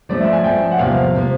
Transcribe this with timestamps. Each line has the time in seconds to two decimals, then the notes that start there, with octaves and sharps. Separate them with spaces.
0.09 F3 A3 C#4 D5
0.21 E5
0.33 G#5
0.44 F3 A3 C#4 G5
0.71 F#5
0.79 E2 C3 F3 A#3 F5
1.15 C3 F3 A#3